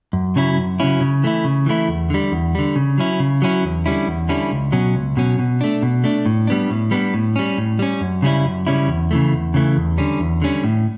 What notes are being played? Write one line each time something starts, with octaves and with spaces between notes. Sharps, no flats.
F#2
C#3 F#3 C#4 E4
F#2
C#3 F#3 C#4 E4
C#3
E3 A3 E4
C#3
E3 A3 E4
E2
D3 G3
E2
D3 G3
C#3
F#3 C#4 E4
C#3
F#3 C#4 E4
E2
D3 G3 C#4 E4
E2
D3 G3 C#4 E4
C#2
B2 F#3 C#4
C#2
B2 F#3 C#4
B2
A3 D4
B2
A3 D4
A2
G3 B3 D4
A2
G3 B3 D4
A2
G3 C#4
A2
G3 C#4
F#2
C#3 G3 C#4 E4
F#2
C#3 G3 C#4 E4
E2
C#3 E3 A3
E2
C#3 E3 A3
E2
D3 G3 C#4
E2
D3 G3 C#4
A2